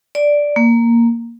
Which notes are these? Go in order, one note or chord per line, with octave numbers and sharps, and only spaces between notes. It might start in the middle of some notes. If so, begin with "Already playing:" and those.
D5
A#3